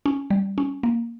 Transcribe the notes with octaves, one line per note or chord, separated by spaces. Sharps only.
C#4
G3
C#4
A#3